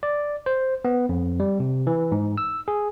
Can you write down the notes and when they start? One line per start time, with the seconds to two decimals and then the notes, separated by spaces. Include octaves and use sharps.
0.03 D5
0.46 C5
0.85 B3
1.09 F2
1.40 G3
1.60 C3
1.87 E3
2.12 G#2
2.38 E6
2.68 G#4